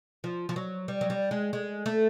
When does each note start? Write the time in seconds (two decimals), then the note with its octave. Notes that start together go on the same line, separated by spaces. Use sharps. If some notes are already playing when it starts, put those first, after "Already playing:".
0.24 F3
0.49 F3
0.56 F#3
0.88 G3
1.01 F#3
1.10 G3
1.31 G#3
1.53 G#3
1.86 A3